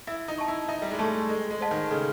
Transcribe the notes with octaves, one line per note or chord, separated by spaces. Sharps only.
E4 E5
D#4
A5 C#6
E4
D#4 E5
G3
G#3
A3 A5 C#6
G#3 A4
G#3
C5 D#5 F#5 A5
D#3
C#3 A4